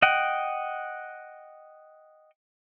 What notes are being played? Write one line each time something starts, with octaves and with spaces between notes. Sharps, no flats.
D#5 F#5 G5